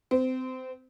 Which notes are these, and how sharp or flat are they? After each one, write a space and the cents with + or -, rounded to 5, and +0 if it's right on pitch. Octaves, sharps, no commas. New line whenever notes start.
C4 -25